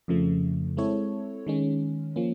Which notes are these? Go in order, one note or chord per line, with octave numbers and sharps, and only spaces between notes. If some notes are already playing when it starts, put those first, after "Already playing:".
F2 C#3 F3 A3
G#3 C4 E4 A4 C#5
D#3 G#3 C#4
F3 A#3 C#4